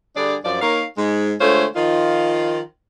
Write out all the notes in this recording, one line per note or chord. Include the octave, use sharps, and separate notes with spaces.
D3 G3 D4 G#4 D5
F#2 F3 D5
A#3 D#4 A#4 C#5 F5
G#2 G#3
D3 G#3 A3 F4 C5 C#5
D#3 F3 D#4 F4